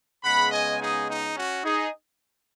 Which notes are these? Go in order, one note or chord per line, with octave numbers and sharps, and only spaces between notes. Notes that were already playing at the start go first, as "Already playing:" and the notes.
C#3 G#3 B3 F#5 B5
D#5 G#5
D#4 G#4
D#4
C#4 F#4
D#4 G#4